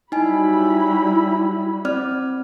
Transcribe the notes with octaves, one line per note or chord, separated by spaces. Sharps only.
F#3 G3 D#4 E4 G#5 B5
C4 D5 F6